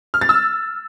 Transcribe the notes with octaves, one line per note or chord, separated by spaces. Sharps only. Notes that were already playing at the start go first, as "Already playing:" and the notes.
F6
A6
E6